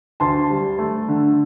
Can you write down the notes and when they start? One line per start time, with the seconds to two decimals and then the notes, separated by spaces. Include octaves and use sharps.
0.20 D2 A5 C6
0.50 G3
0.79 A3
1.08 D3